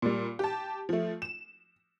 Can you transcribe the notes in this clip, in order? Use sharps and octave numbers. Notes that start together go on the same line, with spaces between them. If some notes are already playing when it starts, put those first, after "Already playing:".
A#2 G3
G4 A5
F3 A3
E7